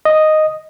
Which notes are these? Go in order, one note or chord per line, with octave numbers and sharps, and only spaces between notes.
D#5